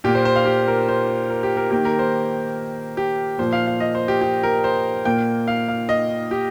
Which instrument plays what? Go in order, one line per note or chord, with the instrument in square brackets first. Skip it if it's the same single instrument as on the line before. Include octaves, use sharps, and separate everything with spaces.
[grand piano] A#2 G4
A#3
C5
C5
F5
G4
A#4
C5
A#4
G4
A#4
D#3 A#3 G4
A#4
C5
G4
A#2 F3 A#3 C5
F5
F5
D#5
C5
G4
G4
A#4
C5
A#2 A#3 G5
F5
F5
D#5
G4